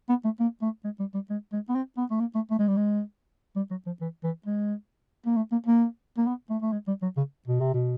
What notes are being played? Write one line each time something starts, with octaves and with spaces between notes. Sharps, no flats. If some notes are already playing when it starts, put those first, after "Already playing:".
B3
A3
A#3
A3
G#3
G3
G3
G#3
G#3
B3
C4
B3
A3
A#3
A3
A3
G#3
G3
G#3
G3
F#3
F3
E3
E3
G#3
A#3
A3
A#3
A#3
A#3
B3
A3
A3
G#3
G3
F#3
C#3
B2
C3
B2